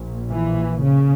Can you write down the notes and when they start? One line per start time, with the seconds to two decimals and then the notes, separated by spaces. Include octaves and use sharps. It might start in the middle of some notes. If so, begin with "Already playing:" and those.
Already playing: A#1 A#2
0.31 E3
0.83 C#3